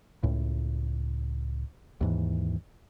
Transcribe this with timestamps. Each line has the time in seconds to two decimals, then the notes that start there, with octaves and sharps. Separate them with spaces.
0.23 C#2 A2
2.01 D#2 G#2 E3